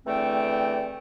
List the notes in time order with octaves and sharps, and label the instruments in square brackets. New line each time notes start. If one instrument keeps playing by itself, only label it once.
[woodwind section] E2 D3 A3 C4 G5